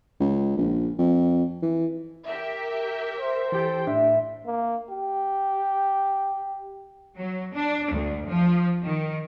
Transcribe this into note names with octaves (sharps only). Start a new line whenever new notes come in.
C#2
A#1
F2
E3
G4 A#4 E5
C5
E3 G4 A4 G5
A2 D4 E5
A#3
G4
F#3
D4
D2
F3
D#3